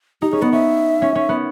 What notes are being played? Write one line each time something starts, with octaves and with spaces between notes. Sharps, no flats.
D#4 G4
C#4 G#4
B3 D#5
C#4 E5
C#4
C#4
B3